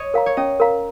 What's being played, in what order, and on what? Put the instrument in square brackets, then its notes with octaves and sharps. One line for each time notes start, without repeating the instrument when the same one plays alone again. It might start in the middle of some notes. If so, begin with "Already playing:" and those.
Already playing: [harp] C#5 D#5
[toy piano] A#4 F5 A#5
[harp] C#5
[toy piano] C#4 [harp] D#5
[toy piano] A#4 F5 A#5